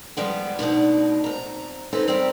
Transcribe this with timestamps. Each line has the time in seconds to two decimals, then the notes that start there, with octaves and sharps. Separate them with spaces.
0.17 F3 G3 G#3 B3
0.59 D2 B2 D4 D#4
1.24 F2 A#5
1.93 C4 C#4 D#4 A4 B4
2.08 G3 C4 G4 A#4